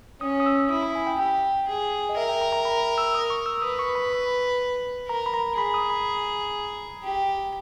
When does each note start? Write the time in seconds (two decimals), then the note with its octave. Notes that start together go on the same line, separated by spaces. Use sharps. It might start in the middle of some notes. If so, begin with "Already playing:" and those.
0.21 C#4 D#6
0.40 D#6
0.46 E6
0.70 E4 D#6
0.83 B5
0.95 G#5
1.07 G5
1.19 G4 G5
1.68 G#4
2.09 D#5
2.17 A#4 E5
2.29 G5
2.42 A#5
2.53 A#5
2.65 B5
2.98 E6
3.15 D#6
3.30 C#6
3.46 E6
3.62 B4 D#6
3.79 C#6
3.95 B5
5.08 A#4 A#5
5.26 B5
5.34 A#5
5.57 G#4 B5
5.74 D#6
5.90 B5
7.04 G4